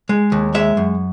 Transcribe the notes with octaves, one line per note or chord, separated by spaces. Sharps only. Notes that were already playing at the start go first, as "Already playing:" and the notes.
G#3
D#2
G#3 E5
F#2